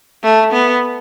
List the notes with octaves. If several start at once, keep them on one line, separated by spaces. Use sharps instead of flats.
A3
B3